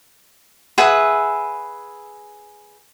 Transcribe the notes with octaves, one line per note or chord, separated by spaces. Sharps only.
G#4 B4 E5 F#5